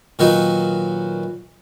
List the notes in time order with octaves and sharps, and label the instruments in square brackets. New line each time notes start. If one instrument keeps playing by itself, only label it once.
[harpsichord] A#2 D#3 F#3 B3 D#4 F#4